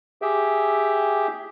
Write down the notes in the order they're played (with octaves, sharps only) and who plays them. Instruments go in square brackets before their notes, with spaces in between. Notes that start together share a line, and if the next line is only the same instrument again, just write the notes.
[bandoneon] G4 G#4 E5 G5